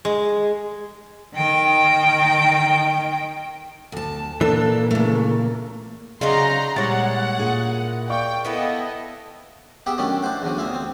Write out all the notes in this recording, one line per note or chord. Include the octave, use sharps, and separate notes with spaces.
G#3
D#3 G5
D2 A5
A#2 E3 A#3 D4 A4
C#3 A3
C#3 F#3 D#4 D5 E5 F5 A#5 C6
A#2 G3 G#3 E4 C#5 F#5 A6
A#2 G#4 A#4
D5 F5 G5 C#6
B3 E4 A4 D#5
B3 G4 G#4 E5 G5
D#3 F#3 A3 C#4 D4 E4
D4 E4 C5 F#5
E2 D3 F#3
D2 B3 F4 E5 F5 G#5
C4